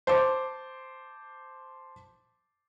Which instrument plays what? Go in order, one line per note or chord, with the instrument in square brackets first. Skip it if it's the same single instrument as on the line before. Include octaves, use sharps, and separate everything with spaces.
[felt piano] C5 A5 D6